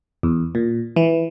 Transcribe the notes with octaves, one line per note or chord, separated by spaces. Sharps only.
E2
A#2
E3